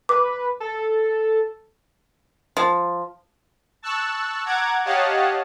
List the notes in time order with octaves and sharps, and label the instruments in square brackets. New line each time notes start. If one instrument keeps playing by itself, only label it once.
[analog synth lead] B4 [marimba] D6
[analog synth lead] A4
[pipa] F3
[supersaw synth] A5 C#6 E6 F#6
F#5 A#5 D6 G#6
G4 C#5 D#5 F5 F#5 A5